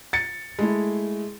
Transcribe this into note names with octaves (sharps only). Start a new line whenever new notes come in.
A6 C#7
G#3 A3 E4